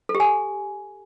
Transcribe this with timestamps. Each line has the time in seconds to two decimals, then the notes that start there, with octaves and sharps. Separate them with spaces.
0.09 A4
0.15 G4
0.20 G#5